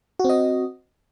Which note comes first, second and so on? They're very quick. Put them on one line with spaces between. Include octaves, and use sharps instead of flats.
F#4 C4 D#5